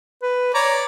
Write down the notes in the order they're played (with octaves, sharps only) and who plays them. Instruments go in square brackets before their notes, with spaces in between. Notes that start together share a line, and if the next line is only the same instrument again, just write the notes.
[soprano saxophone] B4
[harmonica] C#5 D5 [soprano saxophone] A#5